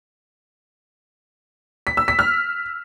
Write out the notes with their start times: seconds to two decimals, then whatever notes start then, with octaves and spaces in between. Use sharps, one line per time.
1.87 B6
1.97 E6
2.08 B6
2.19 F6